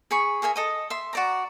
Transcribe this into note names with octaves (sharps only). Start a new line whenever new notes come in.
G#4 G#5 B5 C#6
G#4 A#4 E5 G#5
A4 D#5 D#6
E5 C6
F#4 D5 A#5